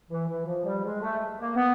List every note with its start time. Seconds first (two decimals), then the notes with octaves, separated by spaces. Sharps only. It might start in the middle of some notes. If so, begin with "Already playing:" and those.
0.10 E3
0.28 E3
0.46 F3
0.64 G3
0.83 G#3
1.01 A3
1.38 A#3
1.56 B3